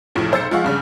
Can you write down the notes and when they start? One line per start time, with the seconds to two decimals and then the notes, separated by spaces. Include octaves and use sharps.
0.15 F1 C#2 A2 F3
0.31 F1 B1 C5 E6 A6 C#7
0.51 F3 G#3 F5 F#5 C#6
0.64 G2 C#3 G3